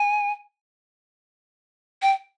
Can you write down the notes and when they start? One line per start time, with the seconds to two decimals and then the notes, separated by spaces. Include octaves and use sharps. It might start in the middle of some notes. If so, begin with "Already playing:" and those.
Already playing: G#5
2.02 G5